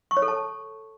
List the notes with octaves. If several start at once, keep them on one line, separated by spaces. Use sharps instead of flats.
C#6
C#5
A4
A5